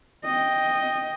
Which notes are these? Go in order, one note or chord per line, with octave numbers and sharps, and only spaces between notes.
D#5 G5